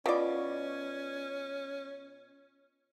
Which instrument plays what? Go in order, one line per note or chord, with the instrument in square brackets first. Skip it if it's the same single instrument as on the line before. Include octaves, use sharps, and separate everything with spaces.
[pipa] B2 D5 [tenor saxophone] C#4 [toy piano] E4 F4 F5